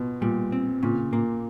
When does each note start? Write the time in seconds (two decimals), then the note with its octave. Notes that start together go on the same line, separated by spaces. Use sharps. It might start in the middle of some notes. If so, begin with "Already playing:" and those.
Already playing: B2
0.21 A#2 G3
0.52 C4
0.83 A#2 C#3
1.13 A#2 A#3